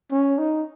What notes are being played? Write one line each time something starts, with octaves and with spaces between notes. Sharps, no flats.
C#4
D#4